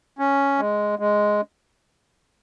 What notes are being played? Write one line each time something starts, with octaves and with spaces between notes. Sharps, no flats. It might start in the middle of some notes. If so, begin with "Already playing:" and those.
C#4
G#3
G#3